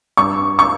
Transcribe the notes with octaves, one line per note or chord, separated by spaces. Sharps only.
G2 C#6
C#6